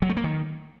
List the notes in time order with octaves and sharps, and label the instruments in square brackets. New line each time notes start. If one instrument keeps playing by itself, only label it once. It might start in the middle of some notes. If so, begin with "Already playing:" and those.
[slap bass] F#3
A3
A#3
D#3